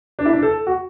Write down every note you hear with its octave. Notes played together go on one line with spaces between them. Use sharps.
D4
E4
D4
A4
F#4